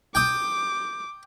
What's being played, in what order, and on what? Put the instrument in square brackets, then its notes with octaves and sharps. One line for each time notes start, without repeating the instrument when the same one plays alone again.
[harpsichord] G5 D#6 [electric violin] D6